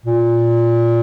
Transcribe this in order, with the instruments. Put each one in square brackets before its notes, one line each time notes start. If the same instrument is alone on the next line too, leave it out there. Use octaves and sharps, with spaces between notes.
[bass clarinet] A#2